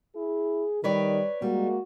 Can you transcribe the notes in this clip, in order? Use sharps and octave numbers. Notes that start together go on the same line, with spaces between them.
E4 G#4
D#3 G3 B4 C#5 D5
G3 G#3 A#3 F#4